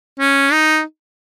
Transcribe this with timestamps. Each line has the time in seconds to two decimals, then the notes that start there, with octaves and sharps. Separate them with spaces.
0.19 C#4
0.52 D#4